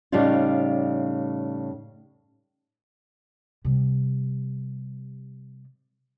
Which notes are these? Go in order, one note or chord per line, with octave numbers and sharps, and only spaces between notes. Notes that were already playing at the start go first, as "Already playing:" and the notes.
A2 C#3 G3 D4 D#4 F4
C3 G3